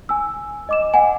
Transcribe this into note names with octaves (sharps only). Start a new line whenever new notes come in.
G#5 E6
D#5 D6 E7
D#5 F#5 G#5